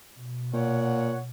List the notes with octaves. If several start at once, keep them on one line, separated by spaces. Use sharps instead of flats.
B2
A#2 C#5 F#5